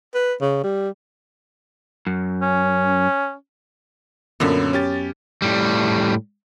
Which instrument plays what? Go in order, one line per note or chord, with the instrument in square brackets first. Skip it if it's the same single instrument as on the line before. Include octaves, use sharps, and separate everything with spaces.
[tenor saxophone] B4
C#3
G3
[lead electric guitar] F#2
[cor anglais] C#4
[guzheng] F#2 B3 [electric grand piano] A#2 D3
[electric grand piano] C#4 G4 A6
[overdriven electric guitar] A2 G3